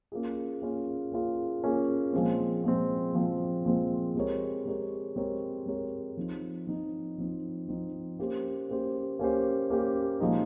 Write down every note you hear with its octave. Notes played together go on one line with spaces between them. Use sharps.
A#3 C#4 F4 G#4
A#3 C#4 F4 G#4
A#3 C#4 F4 G#4
A#3 C#4 F4 G#4
A#2 F3 G#3 C4
A#2 F3 G#3 C4
A#2 F3 G#3 C4
A#2 F3 G#3 C4
G#3 C4 G4 A#4 C#5
G#3 C4 G4 A#4 C#5
G#3 C4 G4 A#4 C#5
G#3 C4 G4 A#4 C#5
F3 C4 D#4
F3 C4 D#4
F3 C4 D#4
F3 C4 D#4
A#3 C#4 G4 C5
A#3 C#4 G4 C5
A#3 C#4 G4 C5
A#3 C#4 G4 C5
A#2 F3 G#3 D#4